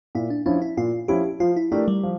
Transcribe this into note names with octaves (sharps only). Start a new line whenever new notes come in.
A#2 E4
D4
F3 C#4 D4 E4
E4
A#2 F4
F3 C#4 E4 G4
F3 F4
E4
A3 D4 E4 G4 A#4
G3
F3